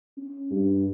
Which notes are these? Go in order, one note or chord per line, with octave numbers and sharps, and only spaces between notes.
C#4
G2